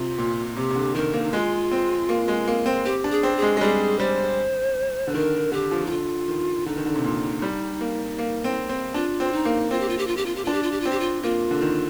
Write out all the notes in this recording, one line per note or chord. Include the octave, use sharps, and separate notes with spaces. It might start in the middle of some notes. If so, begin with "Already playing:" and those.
Already playing: C3 F4
A#2
C3 G4
C3
D3
D#3 A#4
A#3
D#4
G#3 F4
C4
A#3
G#3
A#3
C4
C4 G4
D4
G#4
C4
G#4
G#3
G#3
G3 G#4
G3 C5
D3
D#3 A#4
D3 G4
F3
D#4
D3 F4
D#3
D3 D#4
D#3
D3
C3
A#2
G3
A#3
A#3
C4
C4
D4 F4
C4
D#4
A#3
C4 F4
G4
F4
G4
F4
G4
F4
G4
D4 F4
G4
F4
G4
F4
C4
G4
F4
A#3 F4
D3
D#3